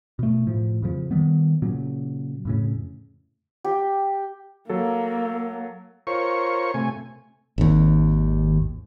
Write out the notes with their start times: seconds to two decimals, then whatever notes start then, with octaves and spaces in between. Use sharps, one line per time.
0.19 B2 A3
0.47 A2 F3
0.82 F2 C#3 F3
1.11 D#3 G3 B3
1.62 A#2 C#3 F#3
2.45 F2 A2 C#3
3.64 G4
4.69 F#3 A#3 A4
6.07 F4 A#4 C5 C#5 C#6
6.74 C3 A3 G#5
7.58 G#1 D#2